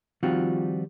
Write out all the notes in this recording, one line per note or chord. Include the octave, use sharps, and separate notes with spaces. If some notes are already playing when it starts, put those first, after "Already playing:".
D#3 F3 G3 C4 F4 F#4